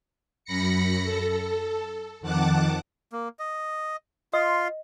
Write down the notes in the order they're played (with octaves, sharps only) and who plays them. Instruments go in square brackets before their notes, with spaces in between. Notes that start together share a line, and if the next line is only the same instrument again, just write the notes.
[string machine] F#2 B5 A#6 C#7
A4
F2 D#3 F#5 A5 D6 F#6
[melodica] A#3
D#5
[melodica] F4 C6 [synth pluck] D#5